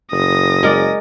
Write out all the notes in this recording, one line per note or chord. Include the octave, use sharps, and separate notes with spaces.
F#1 D#6 A#6
G#3 A#4 D5